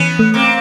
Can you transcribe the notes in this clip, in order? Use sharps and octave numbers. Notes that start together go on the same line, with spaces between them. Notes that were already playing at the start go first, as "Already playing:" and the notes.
Already playing: E3 B3 C#4
A3
A#3 C4